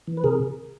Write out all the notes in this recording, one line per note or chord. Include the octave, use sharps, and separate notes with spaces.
E3
B4
C3 G#4 A#4